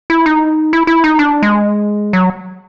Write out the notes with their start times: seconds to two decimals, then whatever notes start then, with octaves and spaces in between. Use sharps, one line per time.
0.10 E4
0.26 D#4
0.73 E4
0.87 E4
1.04 D#4
1.19 D4
1.43 G#3
2.13 F#3